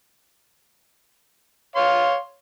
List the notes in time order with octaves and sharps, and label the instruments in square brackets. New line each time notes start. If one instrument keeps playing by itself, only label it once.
[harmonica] C#5 F5 C6